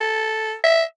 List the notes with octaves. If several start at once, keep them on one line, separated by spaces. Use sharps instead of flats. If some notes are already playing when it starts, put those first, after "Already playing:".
A4
E5